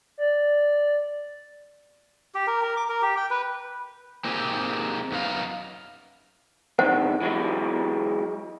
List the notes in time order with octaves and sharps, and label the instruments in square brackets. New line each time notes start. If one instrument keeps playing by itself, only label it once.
[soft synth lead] D5
[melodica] G4
A#4
A#4
D6
A#4
G4
G5
B4
[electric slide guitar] A#3 C4 D#4 G4 G#4
F#2 B3 D#4 F5
[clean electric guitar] A2 D3 D#3 [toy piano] C5 F#5
[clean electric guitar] E3 F#3 G#3